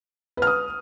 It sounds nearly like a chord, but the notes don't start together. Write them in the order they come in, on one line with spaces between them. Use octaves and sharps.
B4 F6 D#6